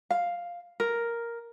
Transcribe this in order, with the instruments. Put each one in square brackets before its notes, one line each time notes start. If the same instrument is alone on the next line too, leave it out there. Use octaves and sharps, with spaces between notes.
[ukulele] F5
A#4